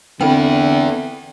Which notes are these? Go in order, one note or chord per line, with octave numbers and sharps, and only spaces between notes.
D3 B3 C4 E4 G5